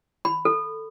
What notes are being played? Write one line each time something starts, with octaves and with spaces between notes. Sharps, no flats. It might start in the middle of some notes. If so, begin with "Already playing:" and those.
B5
A4